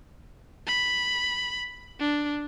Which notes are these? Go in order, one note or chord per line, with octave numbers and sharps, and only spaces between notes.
B5
D4